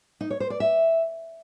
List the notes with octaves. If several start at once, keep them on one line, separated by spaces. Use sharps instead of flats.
D#4
C#5
C5
D5
E5